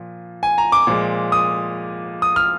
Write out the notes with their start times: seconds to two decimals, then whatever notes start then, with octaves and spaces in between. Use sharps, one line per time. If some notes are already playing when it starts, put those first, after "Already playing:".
Already playing: A#2 F3
0.43 G#5
0.58 A#5
0.72 D6
0.87 A#2 F3 G#3
1.32 D#6
2.22 D#6
2.36 F6